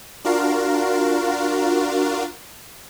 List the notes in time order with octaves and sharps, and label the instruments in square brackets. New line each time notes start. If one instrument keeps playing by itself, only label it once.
[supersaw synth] D4 F4 F#4 A#4 F5